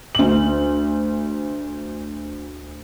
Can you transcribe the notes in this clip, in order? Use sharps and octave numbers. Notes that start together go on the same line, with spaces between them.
D2 F#7